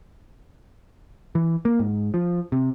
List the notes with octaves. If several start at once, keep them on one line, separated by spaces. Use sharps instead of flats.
E3
A#3
G#2
F3
C3